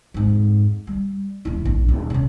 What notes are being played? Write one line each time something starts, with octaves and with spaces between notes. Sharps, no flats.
F2 G#2
G3
D#1 E4
A#1
D#1
C3 C#4